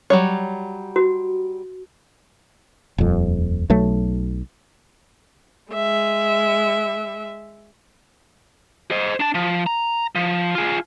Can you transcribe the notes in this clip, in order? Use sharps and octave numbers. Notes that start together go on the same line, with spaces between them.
F#3 G3 C#5
F#4
D#1 F2
B1 F#3 A3
G#3 E5
C5 D#5
D4 A5
F3
A#5
F3
F4 G#4